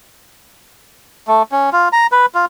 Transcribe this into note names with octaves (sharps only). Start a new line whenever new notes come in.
A3
C#4
F4
A#5
B4
F4